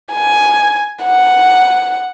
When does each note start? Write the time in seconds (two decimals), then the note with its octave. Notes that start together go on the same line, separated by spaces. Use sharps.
0.14 G#5
1.04 F#5